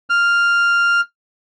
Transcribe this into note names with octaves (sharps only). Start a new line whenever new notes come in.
F6